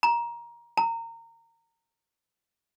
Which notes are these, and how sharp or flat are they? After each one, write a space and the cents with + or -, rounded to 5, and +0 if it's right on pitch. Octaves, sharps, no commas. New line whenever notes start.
A#5 +20
A#5 -25